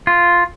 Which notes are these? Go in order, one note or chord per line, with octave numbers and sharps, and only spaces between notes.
F4